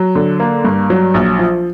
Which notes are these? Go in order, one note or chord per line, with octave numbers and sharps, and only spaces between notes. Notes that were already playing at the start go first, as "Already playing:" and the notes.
Already playing: F#3
D3
A#3
G2
F#3
A#1
F3